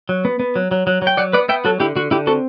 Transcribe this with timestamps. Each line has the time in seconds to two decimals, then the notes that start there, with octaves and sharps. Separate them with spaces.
0.09 F#3
0.25 B3
0.40 B3
0.56 F#3
0.71 F#3
0.87 F#3
1.02 F#3
1.07 G5
1.17 F#3 D5 F#5
1.33 B3 B4 D5
1.49 B3 E5 G5
1.65 F#3 F#4 A4
1.80 D3 E4 G4
1.96 D3 F#4
2.11 D3 E4 G4
2.27 C4 F#4 A4